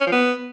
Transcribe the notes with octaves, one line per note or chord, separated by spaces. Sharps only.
C#4
F3
B3